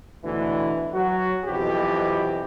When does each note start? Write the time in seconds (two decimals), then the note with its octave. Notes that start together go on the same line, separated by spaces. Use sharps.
0.24 D2 B2 D3 E3
0.94 F#3 F#4
1.46 B1 F2 B2 E3 G4